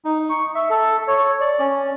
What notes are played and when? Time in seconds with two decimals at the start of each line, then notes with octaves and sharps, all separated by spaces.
0.05 D#4
0.30 C#6
0.55 E5
0.70 A4
1.08 C#5
1.40 D5
1.59 C#4